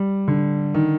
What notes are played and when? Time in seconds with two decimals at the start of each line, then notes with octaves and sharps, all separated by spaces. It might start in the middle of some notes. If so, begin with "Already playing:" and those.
Already playing: G3
0.28 D3
0.74 D#3